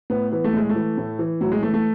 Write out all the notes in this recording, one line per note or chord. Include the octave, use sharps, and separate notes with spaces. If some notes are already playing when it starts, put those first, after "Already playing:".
A2 B3
E3 B3
A3
A2 G#3
A3
E3
A2
E3
A2 F#3
G#3
E3 A3
A3